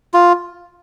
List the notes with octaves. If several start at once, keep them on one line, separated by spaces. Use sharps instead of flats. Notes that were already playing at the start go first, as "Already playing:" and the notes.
F4